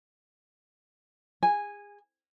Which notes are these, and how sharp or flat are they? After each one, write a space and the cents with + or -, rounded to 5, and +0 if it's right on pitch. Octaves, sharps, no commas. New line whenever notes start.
G#4 -30 G#5 -10